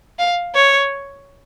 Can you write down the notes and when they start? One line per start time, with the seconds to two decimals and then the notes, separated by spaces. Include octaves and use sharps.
0.19 F5
0.55 C#5